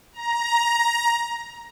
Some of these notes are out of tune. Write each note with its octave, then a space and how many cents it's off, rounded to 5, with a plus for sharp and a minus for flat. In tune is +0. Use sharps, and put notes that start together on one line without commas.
A#5 +15